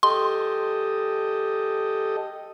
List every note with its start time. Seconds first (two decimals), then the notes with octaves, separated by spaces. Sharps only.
0.03 G4 A4 D#5 C6